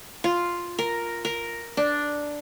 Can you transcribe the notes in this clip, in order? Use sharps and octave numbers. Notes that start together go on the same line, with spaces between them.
F4
A#4
A#4
D4